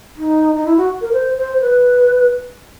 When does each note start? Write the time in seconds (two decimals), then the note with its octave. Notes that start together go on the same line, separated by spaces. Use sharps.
0.17 D#4
0.56 D#4
0.65 E4
0.78 F#4
1.01 A#4
1.13 C5
1.37 C5
1.61 B4